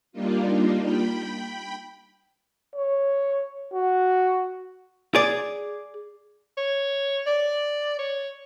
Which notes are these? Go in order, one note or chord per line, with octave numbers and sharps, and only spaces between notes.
G3 A#3 D4 D#4 F4
G5 B5
C#5
F#4
G#4 D5
C#5
D5
C#5